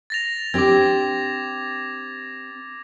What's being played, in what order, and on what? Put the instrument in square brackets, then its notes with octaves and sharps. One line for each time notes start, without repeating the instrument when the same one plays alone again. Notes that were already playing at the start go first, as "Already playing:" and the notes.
[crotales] A6 A#6 F7
[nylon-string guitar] C4 D4 G4 [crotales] D6 G#6